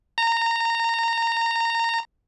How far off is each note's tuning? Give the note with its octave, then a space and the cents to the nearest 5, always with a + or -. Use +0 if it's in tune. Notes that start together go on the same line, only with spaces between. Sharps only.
A#5 -20